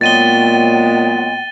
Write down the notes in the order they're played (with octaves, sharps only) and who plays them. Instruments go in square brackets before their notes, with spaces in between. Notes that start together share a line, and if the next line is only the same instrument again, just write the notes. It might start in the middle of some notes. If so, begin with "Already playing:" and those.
[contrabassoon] A#2 [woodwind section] F#3 G#3 B3 [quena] G5 [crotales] A6 D#7 G7